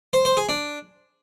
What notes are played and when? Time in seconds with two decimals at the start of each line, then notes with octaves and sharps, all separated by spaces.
0.13 C5
0.25 C5
0.37 G#4
0.49 D4